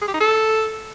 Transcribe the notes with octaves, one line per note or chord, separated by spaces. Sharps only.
G#4
G4
D#4
A4